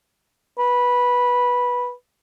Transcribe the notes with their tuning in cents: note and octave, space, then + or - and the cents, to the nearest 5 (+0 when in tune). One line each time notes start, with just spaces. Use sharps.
B4 -10